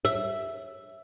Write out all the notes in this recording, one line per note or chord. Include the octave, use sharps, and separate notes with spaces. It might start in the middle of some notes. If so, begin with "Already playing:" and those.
E5